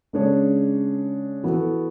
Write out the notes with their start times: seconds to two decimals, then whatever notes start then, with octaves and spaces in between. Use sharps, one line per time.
0.13 C#3 G#3 D4 G#4 C#5
1.44 E3 B3 F#4 A4